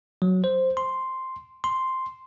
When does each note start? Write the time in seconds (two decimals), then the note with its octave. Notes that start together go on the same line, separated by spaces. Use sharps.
0.22 F#3
0.44 C5
0.77 C6
1.64 C6